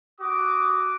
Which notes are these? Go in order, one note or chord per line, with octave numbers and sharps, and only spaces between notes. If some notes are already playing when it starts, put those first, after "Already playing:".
F#4 D6 D#6